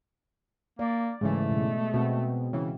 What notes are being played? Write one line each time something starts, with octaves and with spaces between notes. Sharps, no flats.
A#3 D5
G#2 C#3 E3 G#3 A3
B2 G#3
B2 C4 F#4
C#3 E3